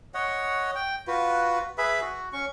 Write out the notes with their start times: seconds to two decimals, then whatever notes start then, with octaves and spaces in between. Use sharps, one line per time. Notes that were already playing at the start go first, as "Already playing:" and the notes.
0.14 C#5 D#5 F#5
0.75 G5
1.07 F4 F#4 B4
1.78 G#4 B4 E5 B5
2.01 F#4
2.33 C#4 C#6